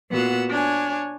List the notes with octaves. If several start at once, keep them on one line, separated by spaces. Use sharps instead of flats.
A#2 B3 F#4 F#5 E6
D4 C#5 G#5